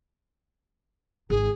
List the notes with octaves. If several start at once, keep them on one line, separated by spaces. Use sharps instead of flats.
G#1 G#4